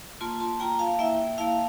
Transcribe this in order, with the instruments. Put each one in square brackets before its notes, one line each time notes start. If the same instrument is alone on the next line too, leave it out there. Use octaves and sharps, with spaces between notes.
[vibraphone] A#3 F4 A5 C6
A5 C6
A#3 F4 G5 A#5
F5 A5
A#3 E4 E5 G5
A#3 E4 F5 A5